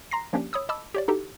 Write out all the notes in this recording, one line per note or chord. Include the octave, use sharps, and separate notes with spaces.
A#5 C6 A#6 C7
F3 A#3 C#4 D4 G4
C#5 B5 D#6 E6
D#5 A5 B5 D6 E6
G4 C#5 D5
D#4 E4 F#4 G4 A4